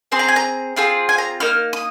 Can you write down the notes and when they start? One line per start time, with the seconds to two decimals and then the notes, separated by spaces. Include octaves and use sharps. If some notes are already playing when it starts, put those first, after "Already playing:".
0.12 C4 G#4 C6
0.19 A#5
0.28 G#5
0.36 A#5
0.76 C4 F4 G#4
1.09 G#5
1.18 A#5
1.40 A#3 D#4 F6
1.73 D#6